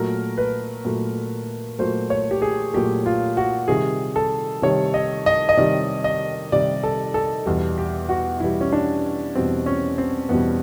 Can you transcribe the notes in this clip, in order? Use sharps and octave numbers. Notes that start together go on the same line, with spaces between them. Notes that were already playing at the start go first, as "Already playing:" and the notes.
Already playing: A#2 F#3 A3 A#4
B4
A#2 F#3 A3
A#2 F#3 A3 C5
C#5
G4
G#4
A#2 F#3 A3 G4
F4
F#4
C3 D#3 G3 G#4
A4
C3 D#3 G3 C#5
D#5
D#5
D#5
C3 D#3 G3 D5
D#5
C3 D#3 G3 D5
A4
A4
E2 B2 G3
G4
F#4
E2 B2 G3 E4
C#4
D4
E2 B2 G3 C4
C#4
C4
E2 B2 G3 B3